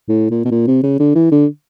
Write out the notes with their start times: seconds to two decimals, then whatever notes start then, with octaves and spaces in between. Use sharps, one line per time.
0.08 A2
0.31 A#2
0.45 B2
0.51 A#2
0.67 C3
0.83 C#3
0.99 D3
1.15 E3
1.31 D3